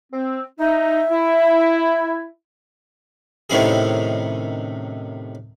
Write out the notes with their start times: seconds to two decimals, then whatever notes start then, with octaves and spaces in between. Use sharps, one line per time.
0.13 C4
0.60 D#4 E5
1.11 E4
3.50 A2 C3 D#3 C#4 E4 G#4